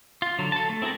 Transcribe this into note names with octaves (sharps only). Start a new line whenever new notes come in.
F4
D3 F#3
A4 A5
A3
C4 E4 F#4 G#4 A#4